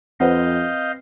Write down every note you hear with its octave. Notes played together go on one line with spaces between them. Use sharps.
F2 C4 B4 C5 D#5 F5 F#5 G6